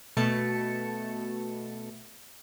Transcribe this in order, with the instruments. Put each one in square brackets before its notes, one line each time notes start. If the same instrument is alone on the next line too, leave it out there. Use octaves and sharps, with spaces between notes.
[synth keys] B2 A3 A5 C#7